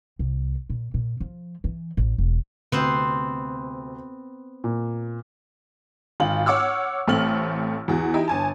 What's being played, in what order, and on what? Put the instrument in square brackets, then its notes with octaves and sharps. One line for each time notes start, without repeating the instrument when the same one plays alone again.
[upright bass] C2
A#2
A#2
F3
E3
A1
E1
[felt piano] D2 C3 [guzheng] B3 C4 C5
[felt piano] A#2
[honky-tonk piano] G#1 F4 F#7
C#5 F#5 D6 E6 F6
A1 A3 C4 F6 F#7
E2 F#4
D#4 E4 G4
G1 G#5 A5